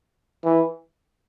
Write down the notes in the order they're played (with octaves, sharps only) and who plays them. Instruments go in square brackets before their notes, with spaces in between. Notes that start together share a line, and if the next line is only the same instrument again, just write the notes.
[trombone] E3